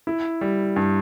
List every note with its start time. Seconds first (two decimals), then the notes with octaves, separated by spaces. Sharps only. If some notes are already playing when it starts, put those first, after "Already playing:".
0.07 E4
0.41 G3
0.76 G2